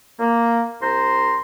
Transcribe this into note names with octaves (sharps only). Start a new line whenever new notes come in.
A#3
C2 C5 A#5 C6